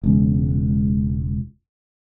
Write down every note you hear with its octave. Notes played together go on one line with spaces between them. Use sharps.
E1 C#2